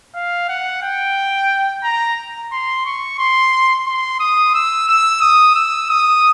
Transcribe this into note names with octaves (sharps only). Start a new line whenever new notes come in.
F5
F#5
G5
A#5
C6
C#6
C6
C6
D#6
E6
E6
D#6
E6
D#6